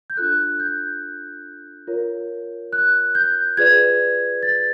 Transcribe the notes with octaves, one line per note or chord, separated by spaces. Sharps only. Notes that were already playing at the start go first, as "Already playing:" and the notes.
G6
D4 F4 A4 F#6
G6
F4 A#4 C#5
F#6
G6
F4 G#4 B4 D5 G#6
A6